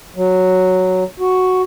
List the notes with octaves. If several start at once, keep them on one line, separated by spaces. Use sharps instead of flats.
F#3
F#4